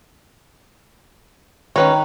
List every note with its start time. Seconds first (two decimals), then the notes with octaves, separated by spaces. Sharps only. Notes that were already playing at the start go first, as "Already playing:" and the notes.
1.76 D#3 C#4 B4 C#5